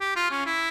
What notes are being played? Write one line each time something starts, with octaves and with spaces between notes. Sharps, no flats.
G4
F4
C#4
E4